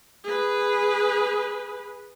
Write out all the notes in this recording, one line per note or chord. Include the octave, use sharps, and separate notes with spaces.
G#4 B4